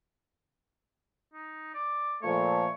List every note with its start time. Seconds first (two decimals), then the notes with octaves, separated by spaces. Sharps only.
1.34 D#4
1.74 D5
2.23 A#2 F3 A3 C#5